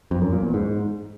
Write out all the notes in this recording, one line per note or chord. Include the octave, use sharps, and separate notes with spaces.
F2
F#2
A#2
E2
G#2